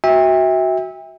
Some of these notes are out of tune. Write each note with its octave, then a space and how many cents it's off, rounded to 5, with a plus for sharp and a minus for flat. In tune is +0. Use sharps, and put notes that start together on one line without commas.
F#4 +5 E5 -20 G5 +35